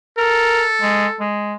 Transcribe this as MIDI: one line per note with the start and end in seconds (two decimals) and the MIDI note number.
0.18 1.25 69
0.18 0.64 70
0.82 1.07 56
1.20 1.56 56